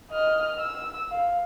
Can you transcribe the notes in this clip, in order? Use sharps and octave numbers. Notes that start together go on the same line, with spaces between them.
D#5 F6
E6
F5